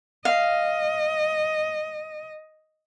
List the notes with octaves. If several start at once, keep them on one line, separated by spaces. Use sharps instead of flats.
D#5 F5